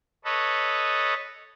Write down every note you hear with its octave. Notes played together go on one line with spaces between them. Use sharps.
A4 B4 C#5 D#5